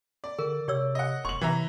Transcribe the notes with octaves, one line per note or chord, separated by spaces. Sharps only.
D5
D3 G#4 A#4
C3 G4 C#5 E6
D#5 F#5
F1 C6 C#6 F#7
C3 E3 E5 A#5